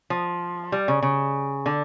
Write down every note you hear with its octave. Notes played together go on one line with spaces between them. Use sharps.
F3
G3
C#3
C#3
D3